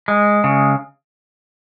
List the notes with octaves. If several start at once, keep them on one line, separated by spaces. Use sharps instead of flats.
G#3
C#3